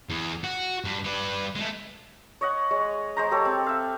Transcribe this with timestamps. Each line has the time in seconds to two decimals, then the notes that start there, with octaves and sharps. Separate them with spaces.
0.10 E2
0.44 F#4
0.84 G2
1.04 G3 B4
1.56 G#3 A3
2.41 C#5 D#5 F#5
2.71 G#3 C#5
3.17 G#3 C5 A#5
3.31 G4 A4 C#5
3.45 C4
3.66 E5 F5